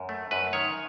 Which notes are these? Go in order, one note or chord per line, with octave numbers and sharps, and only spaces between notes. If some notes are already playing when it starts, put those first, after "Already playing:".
Already playing: F#2
A3
F#2 B4
D#3 C#5